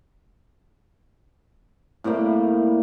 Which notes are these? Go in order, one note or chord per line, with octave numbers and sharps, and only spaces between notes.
A2 C3 G3 A#3